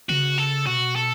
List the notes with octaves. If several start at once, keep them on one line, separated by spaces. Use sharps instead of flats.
C#3 F#4
A4
B2 F#4
A4